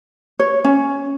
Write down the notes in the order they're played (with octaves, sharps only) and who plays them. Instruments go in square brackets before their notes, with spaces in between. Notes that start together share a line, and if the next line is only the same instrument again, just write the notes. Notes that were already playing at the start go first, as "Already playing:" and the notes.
[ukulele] C#5
C#4